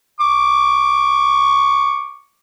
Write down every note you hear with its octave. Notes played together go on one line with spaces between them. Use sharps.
C#6 D6